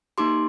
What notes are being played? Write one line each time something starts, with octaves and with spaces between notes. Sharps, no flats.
A#3 D#4 G4 C6 D6